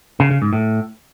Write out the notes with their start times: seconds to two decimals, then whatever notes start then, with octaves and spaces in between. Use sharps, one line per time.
0.20 C#3
0.31 C#3
0.42 G#2
0.53 A2